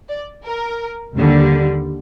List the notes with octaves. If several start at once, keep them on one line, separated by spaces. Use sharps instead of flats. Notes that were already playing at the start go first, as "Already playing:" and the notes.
D5
A#4
D#2 D3 G3